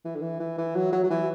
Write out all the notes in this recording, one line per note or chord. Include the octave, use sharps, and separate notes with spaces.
E3
D3
E3
E3
E3
F#3
F#3
F#3
E3